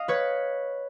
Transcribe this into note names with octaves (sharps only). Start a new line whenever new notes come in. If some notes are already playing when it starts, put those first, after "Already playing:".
Already playing: D#5 F5
B4 C#5